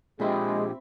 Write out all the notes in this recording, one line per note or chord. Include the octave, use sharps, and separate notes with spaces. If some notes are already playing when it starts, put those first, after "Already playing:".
A#2 G#3 C4 D4 F4 G4 E5 B5